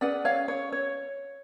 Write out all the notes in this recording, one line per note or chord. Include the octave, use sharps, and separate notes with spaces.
C#4 G#4 B4 D5 F#5
C#5 F5
C#5
C#5